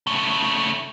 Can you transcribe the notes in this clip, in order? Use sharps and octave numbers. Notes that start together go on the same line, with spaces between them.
C#3 A3